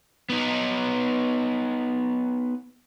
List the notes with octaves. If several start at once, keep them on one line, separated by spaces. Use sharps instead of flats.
B3 D#4